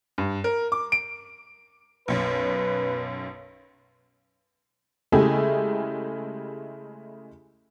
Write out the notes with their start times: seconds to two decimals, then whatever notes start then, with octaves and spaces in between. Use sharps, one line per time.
0.18 G2
0.44 A#4
0.72 D6
0.92 D7
2.08 B1 F#2 B4
5.12 C#3 G#3 A3 E4 G4 G#4